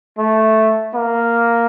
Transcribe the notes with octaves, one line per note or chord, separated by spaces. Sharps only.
A3
A#3